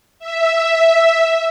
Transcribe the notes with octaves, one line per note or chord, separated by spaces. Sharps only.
E5